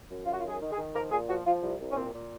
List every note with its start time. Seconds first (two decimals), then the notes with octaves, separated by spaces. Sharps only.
0.09 F#2
0.25 F#2 F4
0.32 F#4
0.39 F4
0.43 D#3
0.49 G#4
0.60 D#3
0.71 G#4
0.77 D#3
0.94 F3 A#4
1.10 A#2 G#4
1.28 F3 F#4
1.45 F3 F4
1.62 C2
1.79 C2
1.90 C#4
1.96 A#2 C4
2.13 A#2